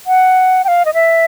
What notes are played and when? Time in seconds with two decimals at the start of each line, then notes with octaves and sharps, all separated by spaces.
0.07 F#5
0.64 G5
0.68 F5
0.85 D#5
0.94 E5